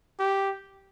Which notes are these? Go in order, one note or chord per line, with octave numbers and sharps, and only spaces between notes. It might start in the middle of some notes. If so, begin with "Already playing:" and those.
G4